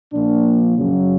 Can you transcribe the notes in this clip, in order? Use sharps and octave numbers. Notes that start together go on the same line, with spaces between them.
A#2 F3 A#3 D4
F#2 C#3 F#3